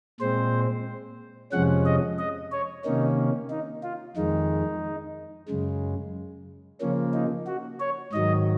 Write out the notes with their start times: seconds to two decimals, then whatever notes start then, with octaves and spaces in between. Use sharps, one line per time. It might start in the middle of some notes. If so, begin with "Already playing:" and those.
0.20 A#2 G#3 C4 C5
1.52 F2 C3 F3 G#3 C#4 F#5
1.86 D#5
2.19 D#5
2.52 C#5
2.85 C3 D#3 A#3 C#4 D#4
3.50 D#4
3.83 F4
4.17 F2 D#3 G#3 D#4
5.48 F#2 C#3 G#3
6.81 C#3 F3 A#3 C#4
7.14 D#4
7.47 F#4
7.80 C#5
8.13 G#2 D#3 F#3 D#5